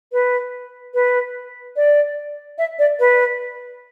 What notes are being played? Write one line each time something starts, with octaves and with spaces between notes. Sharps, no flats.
B4
B4
D5
E5
D5
B4